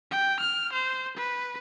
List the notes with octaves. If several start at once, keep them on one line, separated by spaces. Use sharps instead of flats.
G5
F6
C5
B4